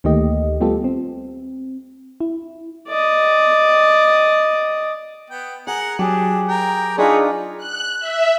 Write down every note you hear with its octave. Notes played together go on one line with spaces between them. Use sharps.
D2 D#3 A3 A#3 G4 D#5
G3 A3 B3 F4 G4 A4
C4
E4
D5 D#5
B3 G5
G#4 A#4 F#5
F#3 D4 G4 G#4
A#4 G5
D4 D#4 F4 G#4 B4 C#5 A#5
F#6
E5